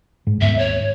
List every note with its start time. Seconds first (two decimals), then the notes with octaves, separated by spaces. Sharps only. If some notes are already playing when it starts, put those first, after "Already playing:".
0.27 G#2
0.41 D#1 G#2 B3 E5
0.59 C#5